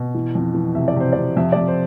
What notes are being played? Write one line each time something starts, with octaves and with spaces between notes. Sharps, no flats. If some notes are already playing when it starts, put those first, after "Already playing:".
Already playing: B2
E3
F2
E3
C3 E5
D5
C3 C5
C3 D5
F2 E5
F2 D5
C5